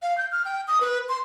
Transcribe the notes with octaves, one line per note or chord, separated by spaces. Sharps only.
F5
G6
F6
G5
D#6
B4
C6